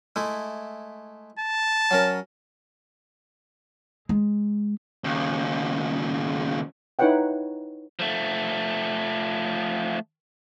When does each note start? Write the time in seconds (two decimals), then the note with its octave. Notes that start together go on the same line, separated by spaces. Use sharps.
0.16 G#3 A3 E4
1.39 A5
1.91 F#3 C#4 A#4
4.09 G#3
5.04 D#2 C#3
6.99 D#4 E4 B4 C#5 F#5 G5
8.00 F3 A3